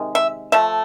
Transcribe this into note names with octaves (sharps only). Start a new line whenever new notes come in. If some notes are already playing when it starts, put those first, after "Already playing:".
Already playing: C3 D#3 G#3
E5
F3 A3 E5